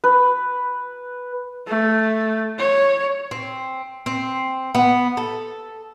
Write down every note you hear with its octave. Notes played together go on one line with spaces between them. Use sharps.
B4
A3
C#5
C4
C4
B3
A4